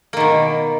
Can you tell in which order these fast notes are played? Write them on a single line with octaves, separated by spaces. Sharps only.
A#3 D#3 B2